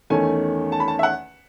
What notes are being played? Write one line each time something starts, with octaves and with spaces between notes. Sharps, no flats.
E2 D#3 A3 C#4 G#5
A5
B5
A5
E5
F#5